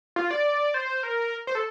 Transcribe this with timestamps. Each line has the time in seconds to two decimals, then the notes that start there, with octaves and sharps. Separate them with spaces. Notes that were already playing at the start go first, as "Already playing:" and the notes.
0.16 F4
0.31 D5
0.74 C5
1.03 A#4
1.47 C5
1.55 A4